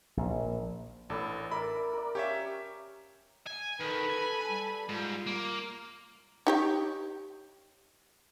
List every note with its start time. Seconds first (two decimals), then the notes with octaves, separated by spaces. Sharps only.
0.17 A#1
1.10 A1 D4 A4 B4
1.51 A#4 D5 E5 B5
1.93 A#4 D5
2.15 C#4 G4 C#5 E5 F5
3.46 G#5
3.80 D#3 A4 B4 B5
4.10 G#5
4.49 G3
4.89 G#2 F4
5.26 A#3
6.47 D#4 G4 C#5